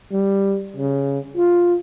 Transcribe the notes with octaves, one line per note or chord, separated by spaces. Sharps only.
G3
C#3
F4